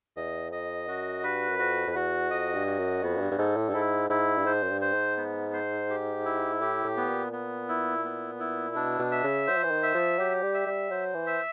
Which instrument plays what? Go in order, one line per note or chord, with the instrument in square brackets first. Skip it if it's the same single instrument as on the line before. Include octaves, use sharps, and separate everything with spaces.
[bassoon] E2 [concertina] D#5
[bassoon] F2 [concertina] D#5
[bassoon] F#2 [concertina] F#4
[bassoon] G2 [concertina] B4
[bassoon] F#2
[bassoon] F2 [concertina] F#4
[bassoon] F2
[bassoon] E2 [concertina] F#4
[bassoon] F2 [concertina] D#5
[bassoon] G2
[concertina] F#4
[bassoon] F#2
[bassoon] F2 [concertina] B3
[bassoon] G#2
G2
G2
[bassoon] G#2 [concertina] A4
[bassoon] A2
G2
[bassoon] G#2 [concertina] E4
[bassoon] G#2 [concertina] E4
[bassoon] G2
[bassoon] G#2 [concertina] C5
[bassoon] F#2
G2
[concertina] C5
[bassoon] G#2
[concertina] B3
C5
G4
E4
[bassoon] A2 [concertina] G4
[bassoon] A2
[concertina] B3
[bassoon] A#2
[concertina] B3
E4
B3
E4
[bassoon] B2 [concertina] D4
[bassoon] B2
[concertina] E5
[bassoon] C#3
[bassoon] F#3 [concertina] C5
[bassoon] F3
E3
D#3
[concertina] E5
[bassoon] F3
[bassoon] F#3 [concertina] G4
[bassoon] G3
[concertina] E5
[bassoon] G3
[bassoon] F#3 [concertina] C5
[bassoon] E3
[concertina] E5